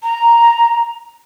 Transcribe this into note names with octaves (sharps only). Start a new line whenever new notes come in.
A#5